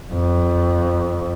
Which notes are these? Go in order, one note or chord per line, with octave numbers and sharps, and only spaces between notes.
F2